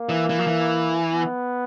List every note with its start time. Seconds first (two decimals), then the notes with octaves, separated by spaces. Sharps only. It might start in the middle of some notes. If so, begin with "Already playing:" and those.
Already playing: A#3
0.09 E3
0.29 E3
0.39 F3
0.47 E3
1.12 B3